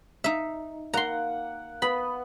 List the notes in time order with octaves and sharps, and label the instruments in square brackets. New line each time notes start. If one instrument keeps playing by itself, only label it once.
[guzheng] D#4 E5
[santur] A#3 F#5 [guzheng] A#5 C6
[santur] B3 [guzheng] B5